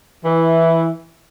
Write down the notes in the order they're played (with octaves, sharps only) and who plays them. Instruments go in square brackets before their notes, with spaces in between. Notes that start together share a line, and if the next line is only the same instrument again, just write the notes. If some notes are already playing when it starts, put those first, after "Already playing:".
[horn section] E3